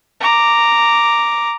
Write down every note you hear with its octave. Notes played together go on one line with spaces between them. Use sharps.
A#5 D6